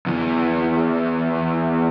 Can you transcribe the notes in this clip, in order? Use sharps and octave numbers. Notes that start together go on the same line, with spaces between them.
E2 E3